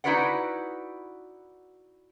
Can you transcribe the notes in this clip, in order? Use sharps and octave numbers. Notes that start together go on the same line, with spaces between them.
D#4 E4 F#4 B4 D5 F#5